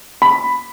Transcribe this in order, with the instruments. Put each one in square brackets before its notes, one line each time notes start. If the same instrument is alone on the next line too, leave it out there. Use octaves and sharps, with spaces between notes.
[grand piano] B5